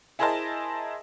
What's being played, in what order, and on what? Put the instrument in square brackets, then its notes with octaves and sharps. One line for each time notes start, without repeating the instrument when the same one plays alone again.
[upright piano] E4 G#4 A#4 C5 D#5 A5